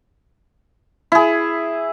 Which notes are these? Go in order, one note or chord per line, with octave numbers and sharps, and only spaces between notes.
E4 G#4